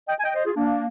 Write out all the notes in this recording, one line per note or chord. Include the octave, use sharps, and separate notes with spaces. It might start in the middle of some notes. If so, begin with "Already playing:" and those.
D#5 G5
G#5
D#5 G5
C5 D#5
F4 G#4
A#3 D4